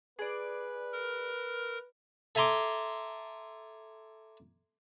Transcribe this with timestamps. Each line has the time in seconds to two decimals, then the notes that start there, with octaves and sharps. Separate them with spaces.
0.19 G#4 B4 D5
0.92 A#4
2.35 A4 E5 G#5 A#5 C6 D6